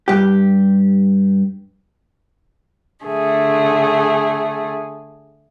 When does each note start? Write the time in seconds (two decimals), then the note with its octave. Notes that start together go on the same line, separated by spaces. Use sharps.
0.08 G2 G4
3.05 D3 A3 G#4